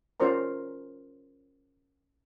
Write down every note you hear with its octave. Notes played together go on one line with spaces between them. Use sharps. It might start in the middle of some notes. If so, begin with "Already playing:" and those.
C#4 F4 A#4 C5 D5 A#5